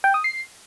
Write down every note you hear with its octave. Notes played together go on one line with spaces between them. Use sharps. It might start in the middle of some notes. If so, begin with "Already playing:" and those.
G5
D#6
C7